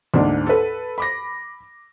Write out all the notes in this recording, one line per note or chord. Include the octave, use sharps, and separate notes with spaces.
D2 G#2 A#3 D4
A4 B4
B5 D6 A#6